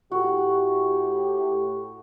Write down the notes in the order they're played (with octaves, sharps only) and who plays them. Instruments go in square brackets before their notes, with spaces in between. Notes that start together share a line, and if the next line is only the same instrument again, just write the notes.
[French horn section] A2 G4 [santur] F#4